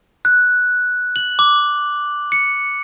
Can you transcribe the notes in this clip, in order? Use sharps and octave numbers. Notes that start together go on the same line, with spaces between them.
F#6
F#7
D6
C#7